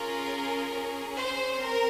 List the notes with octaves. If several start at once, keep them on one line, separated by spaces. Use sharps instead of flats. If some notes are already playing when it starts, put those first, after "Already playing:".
Already playing: C#4 F4 G#4 A#4
C#4 G#4
C5
C4 A#4